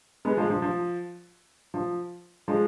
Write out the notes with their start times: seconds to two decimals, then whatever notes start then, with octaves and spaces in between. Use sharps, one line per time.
0.25 G#3 B3
0.37 F3 G#3
0.50 F3
0.62 F3
1.74 F3
2.48 F3 G#3